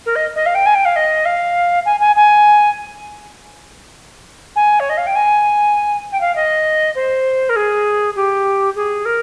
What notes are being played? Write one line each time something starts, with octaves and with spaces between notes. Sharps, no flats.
A#4
D#5
D#5
F5
G5
G#5
G5
F5
D#5
F5
G#5
G#5
G#5
G#5
C#5
D#5
F5
G5
G#5
G5
F5
D#5
C5
A#4
G#4
G4
G#4
A#4